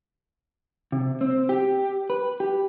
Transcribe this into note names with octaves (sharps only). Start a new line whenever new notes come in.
C3
C4
G4
B4
G4